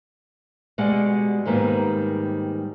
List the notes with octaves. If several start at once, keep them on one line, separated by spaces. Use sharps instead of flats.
B2 G3 G#3 D5 F#5
G#2 D#3 G3 A#3 B3